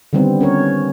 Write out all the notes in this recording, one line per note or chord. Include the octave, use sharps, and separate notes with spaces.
D3 D#3 G3 B3 C4
C#4 A#4 C#5